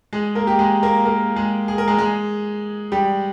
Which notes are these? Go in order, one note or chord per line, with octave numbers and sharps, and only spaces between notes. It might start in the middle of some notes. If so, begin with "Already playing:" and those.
G#3 G#4
A#3 A#4
G4
G#3 G#4
A#3 A#4
A#3 A#4
G#3 G#4
G#4
A#4
G#3 G#4
G#3 G#4
G3 G4